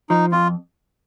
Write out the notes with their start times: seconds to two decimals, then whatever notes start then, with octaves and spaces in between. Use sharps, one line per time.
0.10 F3 D#4
0.32 F2 F4